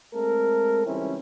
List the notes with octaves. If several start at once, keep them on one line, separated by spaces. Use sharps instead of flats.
G#3 A3 C4 A4 A#4
C#2 E3 G3 C4 C#4 E4